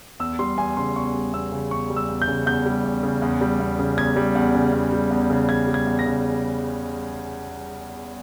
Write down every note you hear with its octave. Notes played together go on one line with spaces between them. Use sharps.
E2 E6
G3 C6
E2 G#5
C#3 C6
E2 C#6
G3
E2 E6
C#3
E2 C#6
G3
E6
E2
G6
C#3
E2 G6
G3
E2
C#3
E2
G3
E2
C#3
E2 G#6
G3
E2
C#3
E2
G3
E2
C#3
E2 G#6
G3
G#6
E2
A#6
C#3